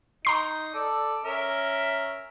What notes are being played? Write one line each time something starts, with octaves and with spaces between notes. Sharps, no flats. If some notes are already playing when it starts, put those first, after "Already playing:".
D#4 A#5 C6 C7
A4 D5 D6
C#4 A#4 E5